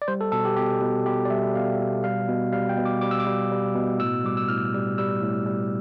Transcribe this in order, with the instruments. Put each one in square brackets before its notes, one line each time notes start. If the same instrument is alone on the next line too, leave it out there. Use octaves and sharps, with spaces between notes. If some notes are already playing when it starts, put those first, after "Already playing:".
[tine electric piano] D5
G3 C5
A4
B2 A4
G4
B2 G4
B2
B2 G4
D5
G3 E5
B2 F5
B2
G3 F5
B2
G3 F5
G5
B2
D6
G3 D6
E6
D6
G3
G3
B2
A2 E6
G3 D6
E6
A2 F6
G3
G3 E6
A2
G3